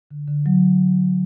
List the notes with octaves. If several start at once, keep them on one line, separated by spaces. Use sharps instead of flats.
D3
D3
F#3